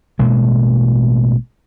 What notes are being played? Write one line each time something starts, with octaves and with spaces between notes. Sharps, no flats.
A1 B2 G#3 A#3